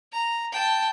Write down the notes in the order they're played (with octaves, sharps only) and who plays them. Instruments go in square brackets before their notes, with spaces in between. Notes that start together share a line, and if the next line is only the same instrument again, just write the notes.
[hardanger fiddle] A#5
G5 A5